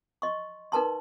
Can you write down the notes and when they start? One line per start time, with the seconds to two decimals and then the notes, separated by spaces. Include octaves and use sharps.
0.22 D#5 C6 C#6
0.72 D#4 A#4 B4 A5 C6